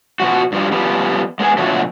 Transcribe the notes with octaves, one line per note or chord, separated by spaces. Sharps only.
B2 F3 F#4
G2 F3 G3
F3 G3 B3
G#3 B3 G#4
B2 D3 F3 F#3 A3